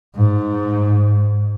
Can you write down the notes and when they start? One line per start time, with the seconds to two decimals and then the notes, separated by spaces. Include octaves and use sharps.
0.16 G#2